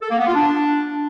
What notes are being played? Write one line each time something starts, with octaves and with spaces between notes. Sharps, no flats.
A4
A#3
B3
F4
D4